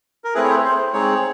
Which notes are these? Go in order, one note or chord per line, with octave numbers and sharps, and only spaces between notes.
A#4
A3 C4 E4 G#4 B4
C#5
C5
C5
G#3 C4 D#4 G#4 C#5